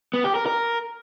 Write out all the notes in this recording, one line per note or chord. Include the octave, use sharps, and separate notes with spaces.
B3
G4
A#4
A#4